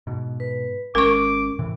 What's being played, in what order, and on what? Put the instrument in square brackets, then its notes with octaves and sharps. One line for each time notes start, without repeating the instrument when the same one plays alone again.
[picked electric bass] G#2 B2
[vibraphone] B4
[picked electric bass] G#1 G#3 [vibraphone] C#4 [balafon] A#4 C#6 [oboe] D6
[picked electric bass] A2 C3 E3